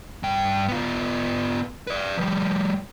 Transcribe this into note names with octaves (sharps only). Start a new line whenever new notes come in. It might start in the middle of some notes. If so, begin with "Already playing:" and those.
G2 G5
B3 F4
B4 D5
F3 G3